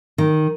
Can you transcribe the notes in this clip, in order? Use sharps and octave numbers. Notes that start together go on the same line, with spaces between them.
D#3